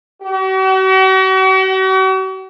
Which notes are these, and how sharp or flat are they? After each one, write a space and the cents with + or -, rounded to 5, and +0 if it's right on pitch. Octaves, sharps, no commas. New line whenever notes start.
F#4 +45